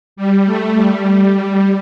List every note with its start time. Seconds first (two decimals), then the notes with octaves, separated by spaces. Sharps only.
0.16 G3
0.46 A3
0.76 G3
1.35 G3